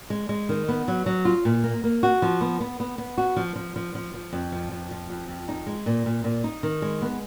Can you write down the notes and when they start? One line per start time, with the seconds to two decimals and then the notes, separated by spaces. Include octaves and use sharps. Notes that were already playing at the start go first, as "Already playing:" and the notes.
0.10 G#3
0.29 G#3
0.49 D#3
0.69 B3
0.88 F#3
1.06 F#3
1.25 F4
1.45 A#2
1.64 A#3
1.84 A#3
2.03 F#4
2.22 F3
2.41 B3
2.60 B3
2.80 B3
2.98 B3
3.18 F#4
3.36 F3
3.56 F3
3.76 F3
3.95 F3
4.14 F3
4.33 F2
4.52 F3
4.72 F2
4.91 F3
5.10 F2
5.28 F2
5.48 D#4
5.67 G#3
5.86 A#2
6.06 A#2
6.24 A#2
6.44 D#4
6.63 D#3
6.82 G#3
7.02 B3